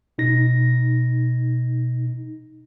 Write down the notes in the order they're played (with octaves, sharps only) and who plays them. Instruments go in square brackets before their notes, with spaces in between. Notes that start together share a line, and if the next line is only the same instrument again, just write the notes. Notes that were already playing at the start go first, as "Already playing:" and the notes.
[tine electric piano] B2 D#4 A#6